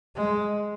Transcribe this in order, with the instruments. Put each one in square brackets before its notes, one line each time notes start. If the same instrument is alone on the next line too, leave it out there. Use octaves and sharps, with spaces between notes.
[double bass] G#3